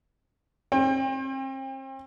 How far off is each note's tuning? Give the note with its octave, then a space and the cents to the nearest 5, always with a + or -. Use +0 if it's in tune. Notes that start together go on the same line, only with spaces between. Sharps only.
C4 +40 G5 +35